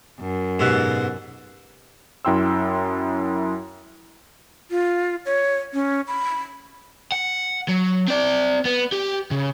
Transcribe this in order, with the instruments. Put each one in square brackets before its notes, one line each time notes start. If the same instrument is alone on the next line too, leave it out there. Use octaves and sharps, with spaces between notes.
[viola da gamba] F#2
[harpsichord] G#2 B2 [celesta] G4 E6 F#6
[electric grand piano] F#2 E4 G5 C6 E6
[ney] F4
C#5
C#4
B5
[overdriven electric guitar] F#5
F#3
C4 D5
B3
G4
C#3